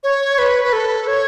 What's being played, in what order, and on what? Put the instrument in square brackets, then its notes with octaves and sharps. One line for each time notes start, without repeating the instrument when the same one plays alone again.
[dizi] C#5
B4
B4
A4
C#5